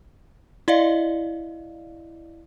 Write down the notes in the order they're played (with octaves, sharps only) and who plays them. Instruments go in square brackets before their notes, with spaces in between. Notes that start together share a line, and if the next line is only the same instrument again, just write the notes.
[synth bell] E4 D5 D#5 F5